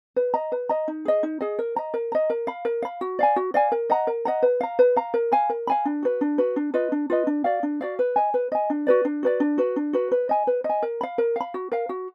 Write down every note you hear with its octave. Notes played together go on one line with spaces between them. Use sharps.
B4
D#5 A#5
B4
D#5 A#5
D#4
G#4 D#5
D#4
G#4 D#5
A#4
D#5 A#5
A#4
D#5 A#5
A#4
F5 B5
A#4
F5 B5
F#4
D5 F5 G#5
F#4
D5 F5 G#5
A#4
D#5 F#5 A#5
A#4
D#5 F#5 A#5
B4
F5 A#5
B4
F5 A#5
A#4
F5 G#5 B5
A#4
F5 G#5 B5
D4
F#4 B4
D4
F#4 B4
D4
F4 B4 D#5
D4
F4 B4 D#5
D4
F#4 D5 F5
D4
F#4 D5 F5
B4
D#5 G#5
B4
D#5 G#5
D4
F#4 B4 D5
D4
F#4 B4 D5
D4
F#4 B4
D4
F#4 B4
B4
D#5 G#5
B4
D#5
G#5
A#4
F5 B5
A#4
F5 B5
F#4
A#4 F5
F#4